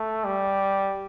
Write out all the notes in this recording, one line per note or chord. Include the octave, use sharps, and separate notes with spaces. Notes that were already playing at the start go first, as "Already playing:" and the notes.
Already playing: A3
G3